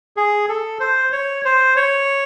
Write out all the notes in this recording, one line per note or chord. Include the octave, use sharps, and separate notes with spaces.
G#4
A4
C5
C#5
C5
C#5